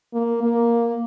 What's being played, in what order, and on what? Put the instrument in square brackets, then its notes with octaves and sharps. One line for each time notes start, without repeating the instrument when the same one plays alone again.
[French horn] A#3
A#3